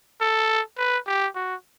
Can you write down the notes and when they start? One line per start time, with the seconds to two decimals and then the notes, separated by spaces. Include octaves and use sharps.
0.21 A4
0.78 B4
1.07 G4
1.35 F#4